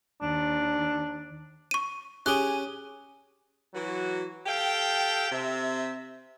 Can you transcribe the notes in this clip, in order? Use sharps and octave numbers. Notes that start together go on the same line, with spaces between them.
D#2 D4
C#6 D#7
C#4 G4 G#4 G#5 F#6
E3 F#3 F#4
G4 A4 F5 G5
C3 E5